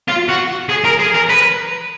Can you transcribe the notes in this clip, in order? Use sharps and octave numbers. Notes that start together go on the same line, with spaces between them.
F4
F#4
G#4
A#4
G#4
A#4
B4